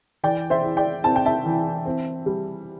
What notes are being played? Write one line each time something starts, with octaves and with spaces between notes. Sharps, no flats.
E3 D5 G5
C5 E5
E4
D5 G5
C4 A5
G5
E5 A5
E3
C4
G3